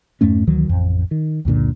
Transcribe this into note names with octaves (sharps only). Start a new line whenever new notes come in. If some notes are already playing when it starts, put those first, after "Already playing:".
F2 G#2 A3 C#4
D2 D#3 E3 F#3
A1 F2
D#3
C#2 F#2 A#2 D3